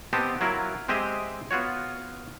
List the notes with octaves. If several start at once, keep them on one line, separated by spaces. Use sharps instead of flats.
B3 C4 G4 D#5 A5
F#3 E4 F4 A#4
G#3 C4 G4 G#4 D#5 E5
B3 F4 F#4 C#5